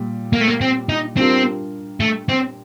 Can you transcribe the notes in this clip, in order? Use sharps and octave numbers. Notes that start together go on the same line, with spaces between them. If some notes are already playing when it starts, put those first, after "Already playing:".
Already playing: A#2 G3
A#3
A3
A#3
C4
D#4
G3 C4 D4 F4 A#4
A3
C4